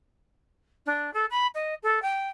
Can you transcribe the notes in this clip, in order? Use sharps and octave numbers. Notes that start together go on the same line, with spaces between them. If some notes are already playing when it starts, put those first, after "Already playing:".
D4
A4
B5
D#5
A4
G5